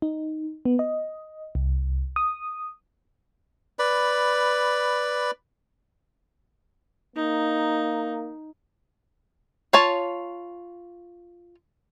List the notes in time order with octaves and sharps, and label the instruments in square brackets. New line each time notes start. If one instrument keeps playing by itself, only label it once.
[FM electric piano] D#4
B3
D#5
C2
D#6
[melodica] B4 D5 B5
[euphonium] A#3 [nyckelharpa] D#4
[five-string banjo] F4 C#5 A5